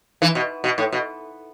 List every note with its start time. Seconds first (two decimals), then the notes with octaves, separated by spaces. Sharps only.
0.22 E3
0.35 B2
0.64 B2
0.78 A2
0.92 B2